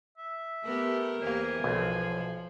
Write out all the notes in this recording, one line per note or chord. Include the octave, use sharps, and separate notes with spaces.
E5
A3 B3 G4 A#4
E2 A#3 G4 C5 F5 G#5
B1 F3